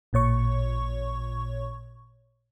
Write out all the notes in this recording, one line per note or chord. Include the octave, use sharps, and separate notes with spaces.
A1 A#2 C#5 C#6